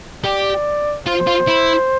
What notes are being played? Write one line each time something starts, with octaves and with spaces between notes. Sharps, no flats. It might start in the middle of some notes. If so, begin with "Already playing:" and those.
G4 D5
F4 C5
F4
E4